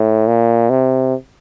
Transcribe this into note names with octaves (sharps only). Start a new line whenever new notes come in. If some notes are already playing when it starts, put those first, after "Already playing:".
Already playing: A2
A#2
C3